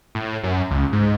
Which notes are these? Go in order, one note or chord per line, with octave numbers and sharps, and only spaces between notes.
A2
F#2
C#2
G#2